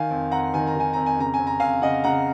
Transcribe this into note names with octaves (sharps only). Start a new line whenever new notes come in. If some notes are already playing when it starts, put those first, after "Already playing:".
Already playing: D#3 F5 G#5
F2
F2 F#5 A#5
D#3 G#5
A#5
D#3 G#5
F2 A#5
G#5
C#3 A#5
G#5
F2
A#5
F2 F5 G#5
C#3 D#5 F#5
C#3 F#5 A#5